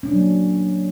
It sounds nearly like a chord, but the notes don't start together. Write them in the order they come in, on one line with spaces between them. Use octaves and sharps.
C#4 D4 F#3 A#3